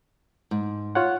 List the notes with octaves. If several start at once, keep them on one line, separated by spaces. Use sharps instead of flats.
G#2
F4 C#5 F#5